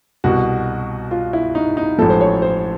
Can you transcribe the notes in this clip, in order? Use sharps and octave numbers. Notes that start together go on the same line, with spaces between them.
C2 B2 F#4
F4
E4
D#4
D#4
A1 G#2 F3 A4
C5
C#5
C5